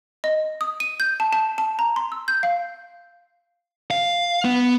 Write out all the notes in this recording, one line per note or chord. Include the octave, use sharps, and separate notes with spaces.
D#5
D#6
D#7
G6
A5
A5
A5
A#5
C6
E6
G6
F5
F5
B3